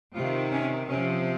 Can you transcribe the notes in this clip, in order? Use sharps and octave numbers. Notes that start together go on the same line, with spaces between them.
C3 D#3 F4
C#4
C3 F3 C#4